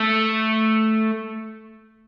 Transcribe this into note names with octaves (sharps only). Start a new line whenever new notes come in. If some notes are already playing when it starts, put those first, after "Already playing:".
Already playing: A3